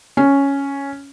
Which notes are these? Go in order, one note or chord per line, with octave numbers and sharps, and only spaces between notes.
C#4